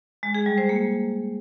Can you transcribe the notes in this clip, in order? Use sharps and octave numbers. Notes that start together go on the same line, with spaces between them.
G#3
G#4
G3
C5
A#3